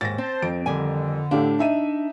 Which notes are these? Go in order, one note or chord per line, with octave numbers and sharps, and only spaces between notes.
D#2 G#2 A6 A#6
C4 C5 A5
F2 D7
D3 D#3 G3 G#5
A2 D4 G4 F5
D#4 E5 D#7